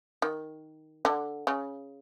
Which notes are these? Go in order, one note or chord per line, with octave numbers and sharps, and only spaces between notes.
D#3
D3
C#3